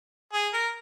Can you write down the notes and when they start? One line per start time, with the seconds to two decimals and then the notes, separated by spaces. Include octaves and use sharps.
0.33 G#4
0.54 A#4